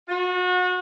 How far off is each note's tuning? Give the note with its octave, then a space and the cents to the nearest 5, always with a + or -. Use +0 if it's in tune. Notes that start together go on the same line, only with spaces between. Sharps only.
F#4 -35